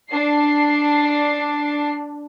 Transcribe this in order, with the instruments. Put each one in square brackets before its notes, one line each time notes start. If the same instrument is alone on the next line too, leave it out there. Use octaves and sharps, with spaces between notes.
[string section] D4 C7